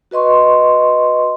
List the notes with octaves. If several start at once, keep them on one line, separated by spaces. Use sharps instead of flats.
F#4 B4 D#5 C6 C#6